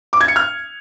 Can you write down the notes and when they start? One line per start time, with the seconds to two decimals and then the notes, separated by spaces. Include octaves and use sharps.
0.13 D6
0.21 G#6
0.28 C#7
0.36 F6